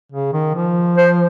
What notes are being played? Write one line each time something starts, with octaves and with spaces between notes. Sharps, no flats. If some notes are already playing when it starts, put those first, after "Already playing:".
C#3
D#3
F3
C5